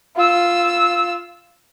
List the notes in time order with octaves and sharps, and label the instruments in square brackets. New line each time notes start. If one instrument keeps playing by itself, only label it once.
[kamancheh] F4 E6